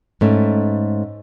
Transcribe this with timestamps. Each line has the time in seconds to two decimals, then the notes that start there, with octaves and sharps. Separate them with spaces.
0.21 G#2 A3 C#4